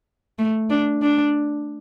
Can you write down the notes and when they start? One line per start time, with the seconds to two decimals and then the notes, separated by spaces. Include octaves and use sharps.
0.39 A3
0.70 D4
1.02 D4